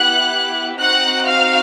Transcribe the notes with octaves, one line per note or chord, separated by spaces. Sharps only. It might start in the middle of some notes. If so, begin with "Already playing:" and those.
Already playing: B3 E4 G4 F#5 F#6
C4 D#4 F#4 F#5 F#6
F5 F6